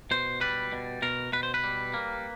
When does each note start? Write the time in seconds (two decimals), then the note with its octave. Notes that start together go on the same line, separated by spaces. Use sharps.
0.11 B2 C5
0.41 G3 B4
0.72 B2
1.02 B2 A#4
1.33 B2 B4
1.43 C5
1.54 B4
1.64 G3
1.94 A#3